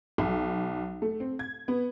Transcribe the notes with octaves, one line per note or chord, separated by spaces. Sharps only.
B1
A3
C4
G#6
B3